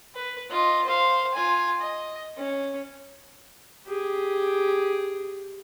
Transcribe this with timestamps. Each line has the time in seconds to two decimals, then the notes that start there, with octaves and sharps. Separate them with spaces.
0.15 B4
0.50 F4 D#5
0.85 C5 F5
1.34 F4 G#5
1.81 D#5
2.37 C#4
3.87 G4 G#4